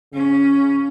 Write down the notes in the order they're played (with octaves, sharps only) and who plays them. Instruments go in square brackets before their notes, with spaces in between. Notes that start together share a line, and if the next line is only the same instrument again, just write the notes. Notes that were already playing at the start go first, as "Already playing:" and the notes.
[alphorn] C#3 [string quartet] C#4